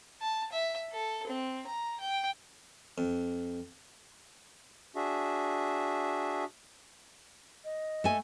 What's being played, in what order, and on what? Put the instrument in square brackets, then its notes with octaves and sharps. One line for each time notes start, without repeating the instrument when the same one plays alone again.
[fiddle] A5
E5
A4
C4
A#5
G5
[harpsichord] F2
[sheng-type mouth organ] D4 F#4 G#4 E5
[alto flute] D#5
[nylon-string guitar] A3 G#5